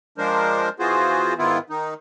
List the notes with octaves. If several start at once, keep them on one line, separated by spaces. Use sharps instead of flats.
F3 G#3 D4 A#4 C5
E3 B3 F4 F#4 G#4 C5
G#2 D#3 B3 E4 F4
D#3 D#4